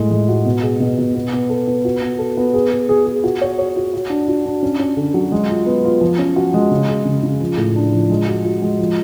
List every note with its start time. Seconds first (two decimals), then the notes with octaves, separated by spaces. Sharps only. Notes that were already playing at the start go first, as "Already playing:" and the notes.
Already playing: A2 G#3
0.11 G#3
0.29 F#4
0.46 B2
0.63 G#4
0.80 B2
0.98 B2
1.15 B3
1.33 B3
1.50 A4
1.67 B3
1.85 F#4
2.02 B3
2.19 A4
2.37 B3
2.53 G#4
2.71 G#4
2.89 G#4
3.06 G#4
3.24 F#4
3.42 C#5
3.59 C#5
3.76 F#4
3.94 F#4
4.10 D4
4.28 F#4
4.46 D4
4.63 C#4
4.79 C#4
4.97 D3
5.14 F#3
5.32 G#3
5.49 F4
5.66 B3
5.85 F4
6.01 F3
6.19 C#4
6.36 F#4
6.54 G#3
6.71 C#3
6.89 G#4
7.05 C#3
7.23 C#3
7.40 F3
7.57 A2
7.76 D4
7.93 F3
8.10 G#3
8.28 F#4
8.45 F#4
8.62 G#3
8.79 F3